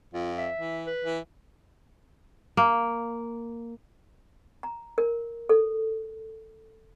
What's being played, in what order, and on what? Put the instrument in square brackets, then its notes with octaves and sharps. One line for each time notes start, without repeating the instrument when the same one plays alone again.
[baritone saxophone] F2 [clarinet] F4
[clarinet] E5
[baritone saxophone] E3
[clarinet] B4
[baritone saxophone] E3
[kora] A#3
[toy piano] A#5
A#4
A4